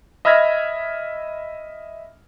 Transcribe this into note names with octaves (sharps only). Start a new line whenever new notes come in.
D#5 E5 B5 F6 G#6 A#6